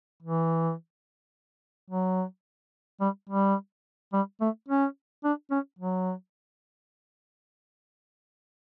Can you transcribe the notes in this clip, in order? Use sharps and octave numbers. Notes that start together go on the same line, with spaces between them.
E3
F#3
G3
G3
G3
A3
C#4
D4
C#4
F#3